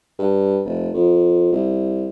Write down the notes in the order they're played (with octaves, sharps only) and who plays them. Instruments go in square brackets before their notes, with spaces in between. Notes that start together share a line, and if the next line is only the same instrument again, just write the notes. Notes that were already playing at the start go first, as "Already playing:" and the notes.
[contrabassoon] G2
F1
F2
C2